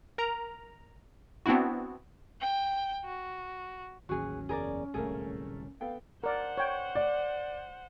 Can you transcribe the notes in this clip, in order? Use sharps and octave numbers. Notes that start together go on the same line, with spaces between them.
A#4 A#5
B3 C4 D4 E4 F#4
G5
F#4
A1 D#2 D#3 F#3 C#4 F#4 G#4
F#1 E2 G#4 A#4 D5
D1 C2 A#2 A3 A#3 G#4 A#4
B3 A4 F5 G5
A#4 C5 D5 F#5
C#5 G5
D5